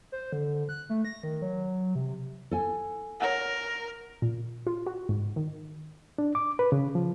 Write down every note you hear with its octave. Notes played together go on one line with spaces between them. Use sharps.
C5
D3
F#6
A3
A#6
D#3
F#3
C3
A4 G#5
A#4 C#5 F#5
A#2
F4
F#4
G#2
D#3
D4
D6
B4
C#3
F3